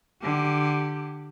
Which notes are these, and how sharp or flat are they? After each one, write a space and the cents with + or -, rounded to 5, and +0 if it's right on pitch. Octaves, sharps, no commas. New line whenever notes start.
D3 +20 G4 +0